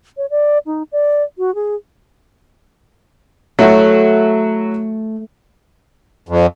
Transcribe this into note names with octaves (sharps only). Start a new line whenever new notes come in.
C#5
D5
D#4
D5
F#4
G#4
F#3 A3 E4 F#4
F2